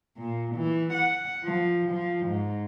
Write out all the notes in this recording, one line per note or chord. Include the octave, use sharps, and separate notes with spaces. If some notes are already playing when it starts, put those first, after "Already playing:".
A#2
E3
F#5
F3
F3
G#2